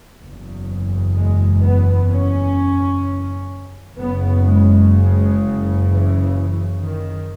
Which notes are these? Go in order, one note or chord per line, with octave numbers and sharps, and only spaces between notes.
F#1 E2 C#3
G#3
B3
C#4
F#1 F#2 C#3 B3
G#3
G#3
E3
D#3